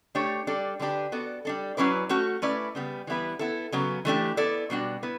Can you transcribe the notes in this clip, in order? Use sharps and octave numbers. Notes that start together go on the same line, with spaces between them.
A3 D4 G4 C#5
G3 D4 A4 D5
D3 G3 D4 G4 B4
B3 F#4 A4 D5
G3 D4 A4
F#3 C#4 E4 B4 D5
A3 C#4 F#4
A3 C#4 E4 B4 D5
C#3 G3 B3
E3 G3 B3 E4 B4
B3 E4 A4
C#3 F#3 B3
E3 A3 D4 G4
B3 E4 A4 D5
B2 G3 D4 F#4
B3 E4 B4